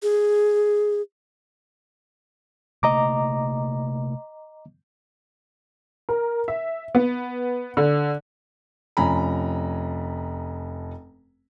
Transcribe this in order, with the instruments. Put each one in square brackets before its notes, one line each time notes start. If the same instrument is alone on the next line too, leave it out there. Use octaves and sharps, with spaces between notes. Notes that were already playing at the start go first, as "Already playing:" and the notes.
[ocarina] G#4
[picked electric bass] C3 A3 A#3 [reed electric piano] D#5 A#5 D6
[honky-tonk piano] A#4
E5
B3
D3
[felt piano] F1 F3 C#4 G#5 A#5 B5